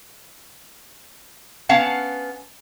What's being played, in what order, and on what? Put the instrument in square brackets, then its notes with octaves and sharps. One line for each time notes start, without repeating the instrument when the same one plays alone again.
[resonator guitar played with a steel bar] B3 C#4 F5 F#5 A5